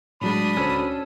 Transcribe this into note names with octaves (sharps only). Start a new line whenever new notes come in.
A2 F#3 G#3 D4 B5 D#6
D2 C#4 F#4 A4 C5